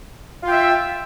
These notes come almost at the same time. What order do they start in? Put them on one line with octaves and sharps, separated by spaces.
F4 G5 E5